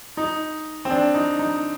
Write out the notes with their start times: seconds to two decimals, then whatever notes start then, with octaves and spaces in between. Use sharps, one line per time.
0.17 D#4
0.85 C4
0.90 D4
1.14 D#4
1.39 D#4